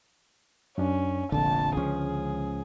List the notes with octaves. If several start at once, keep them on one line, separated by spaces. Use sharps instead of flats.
F#2 C#4 D4
F1 A#1 F2 D3 A5
C#2 F3 C#4 G#4